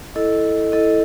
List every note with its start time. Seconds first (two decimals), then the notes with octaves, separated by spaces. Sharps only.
0.15 E4 A4 D#5
0.72 E4 A4 D#5